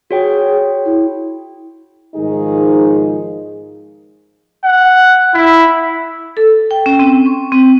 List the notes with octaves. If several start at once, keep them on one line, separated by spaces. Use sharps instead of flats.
F#4 G#4 C#5 G5
E4
G#2 D#3 F3 D#4 G#4
F#5
E4
A4
G5
C#4
C4
C#6
C4